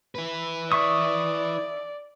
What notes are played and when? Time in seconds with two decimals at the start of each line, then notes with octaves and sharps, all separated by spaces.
0.15 E4 B4
0.72 D5 E5 C#6 D#6